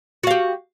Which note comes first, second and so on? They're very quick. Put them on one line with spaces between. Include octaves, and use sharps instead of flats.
F#4 F5 G4